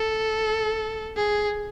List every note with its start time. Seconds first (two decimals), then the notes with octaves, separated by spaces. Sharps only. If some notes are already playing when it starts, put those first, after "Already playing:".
Already playing: A4
1.17 G#4